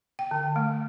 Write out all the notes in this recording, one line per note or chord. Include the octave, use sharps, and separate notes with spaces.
G5
D3
A3